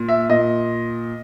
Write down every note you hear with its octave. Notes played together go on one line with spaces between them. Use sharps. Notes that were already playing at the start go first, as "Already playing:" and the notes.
Already playing: A#2
E5
A#2 D#5